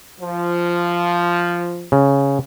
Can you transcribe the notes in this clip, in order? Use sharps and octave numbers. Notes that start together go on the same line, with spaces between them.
F3
C#3